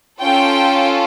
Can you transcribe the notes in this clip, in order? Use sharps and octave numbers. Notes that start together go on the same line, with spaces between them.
C#4 F4 A4 G5